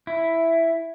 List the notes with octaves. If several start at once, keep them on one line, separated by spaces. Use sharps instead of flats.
E4